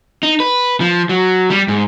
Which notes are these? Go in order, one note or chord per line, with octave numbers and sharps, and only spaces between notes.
D#4
B4
F3
F#3
G3
G#2